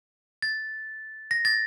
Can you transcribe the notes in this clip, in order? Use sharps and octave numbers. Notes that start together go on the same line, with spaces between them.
A6
A#6
A6